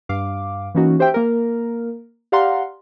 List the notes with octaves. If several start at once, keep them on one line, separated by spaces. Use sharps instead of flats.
G2 F5 D6
E3 A#3 C#4 D#4 F#4
G4 C5 E5 G5
A#3 A#4
G4 D5 F5 F#5 A#5 C6